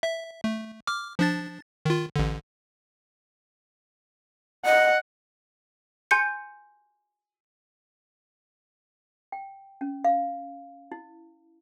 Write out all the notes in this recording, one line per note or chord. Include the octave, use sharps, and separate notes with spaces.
E5
A3
D6 F6
F3 D4 A6
D#3 F4
A1 D3
D#5 F#5
G#5 C6 G6 C#7
G5
C#4
F5
E4